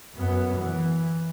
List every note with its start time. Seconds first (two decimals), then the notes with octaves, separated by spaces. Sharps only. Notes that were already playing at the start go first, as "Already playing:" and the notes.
0.14 F#2 B3
0.57 E3